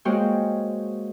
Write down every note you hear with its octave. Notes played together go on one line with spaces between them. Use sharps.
G#3 A#3 F#4 C5 C#5 G5